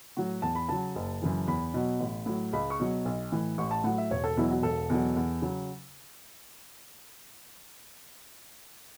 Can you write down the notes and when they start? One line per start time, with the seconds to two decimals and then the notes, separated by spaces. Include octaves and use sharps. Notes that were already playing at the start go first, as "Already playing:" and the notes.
0.17 A2 F#3 F#4
0.42 E2 A5
0.55 B5
0.69 C#3 F#3 A5
0.96 F#1
1.22 F#2 C#3 E3
1.47 E2 B5
1.74 B2 F#3
2.00 A1
2.26 A2 F#3
2.53 C#2 B5
2.70 C#6
2.80 B2 F#3
3.05 B1
3.32 A2 E3
3.58 A1 C#6
3.71 A5
3.84 A2 F#3 F#5
3.98 E5
4.11 E1 C#5
4.24 A4
4.37 E2 B2 F#3 E4
4.51 F#4
4.63 E1 A4
4.90 E2 B2 F#3
5.16 E2
5.42 C#3 F#3